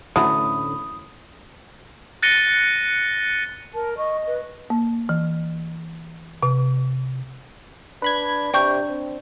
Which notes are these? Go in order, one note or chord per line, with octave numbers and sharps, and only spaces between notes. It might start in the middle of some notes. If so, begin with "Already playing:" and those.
D1 D3 E3 F#3 A3 C#4 B5 D#6
F#6 A6 A#6 C#7 D#7 G7
A#4 A5
D#5 C#6
B4
A#3
E3
C3
D4 B4 B5 G#6
C3 D4 G5 C#6 G6
C4